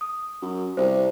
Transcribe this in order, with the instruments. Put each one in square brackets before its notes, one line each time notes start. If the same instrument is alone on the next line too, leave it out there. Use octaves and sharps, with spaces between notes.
[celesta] D#6
[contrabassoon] F#2
[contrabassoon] C2 [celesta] C5